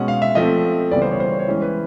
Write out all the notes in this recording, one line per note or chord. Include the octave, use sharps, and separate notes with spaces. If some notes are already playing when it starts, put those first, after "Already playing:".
Already playing: B2 G#3 C#4 F#5
F5
E5
F3 A3 C4 D#5
C#3 E3 G3 B3 D5
C5
C#5
C5
C#5
C#5
E3 G#3 C#4 E4
B4